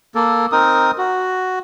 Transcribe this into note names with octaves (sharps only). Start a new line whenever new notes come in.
A#3 A4
C4 D#4 A#4 D#6
F#4